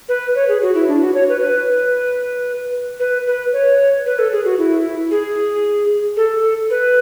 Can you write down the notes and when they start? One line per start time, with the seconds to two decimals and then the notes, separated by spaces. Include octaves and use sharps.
0.09 B4
0.35 C#5
0.48 G#4
0.62 F#4
0.75 E4
0.88 D4
1.01 F#4
1.15 C#5
1.29 B4
1.41 B4
3.00 B4
3.27 B4
3.53 C#5
4.06 B4
4.19 A4
4.32 G#4
4.45 F#4
4.58 E4
5.11 G#4
6.17 A4
6.70 B4